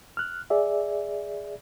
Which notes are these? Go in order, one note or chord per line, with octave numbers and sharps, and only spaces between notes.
F6 F#6
G#4 D5 E5